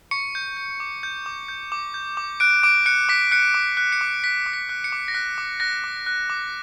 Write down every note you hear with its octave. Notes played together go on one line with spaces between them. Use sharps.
C#6 C#7
G6
G6
D6
G6
D6
G6
D6
G6
D6
F#6 D7
D6 D7
F#6 C#7
D6 B6
F#6 C#7
D6
F#6
C#7
D6
F#6 B6
D6
B6
F#6
C#7
D6
A#6
F#6 B6
D6
F#6 A#6
D6
F#6
D6